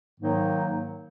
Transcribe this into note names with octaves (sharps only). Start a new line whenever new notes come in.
G#2 D#3 F#3 A#3 D#4